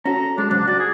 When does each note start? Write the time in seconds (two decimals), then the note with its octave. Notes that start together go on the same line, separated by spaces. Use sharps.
0.05 C#4 F#4 A4 A#5
0.38 G#3 D4
0.50 G#2 C#3 F#3 D4
0.67 F#4 D5
0.79 G#4